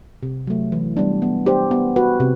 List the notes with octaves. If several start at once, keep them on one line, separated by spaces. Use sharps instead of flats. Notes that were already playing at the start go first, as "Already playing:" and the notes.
C3
F#3 A3
E3
G3 B3 D4
B3
D4 G4 C5
B3
F#4 B4
C3